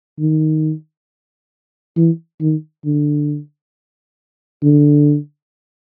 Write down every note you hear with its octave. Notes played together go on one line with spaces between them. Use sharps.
D#3
E3
D#3
D3
D3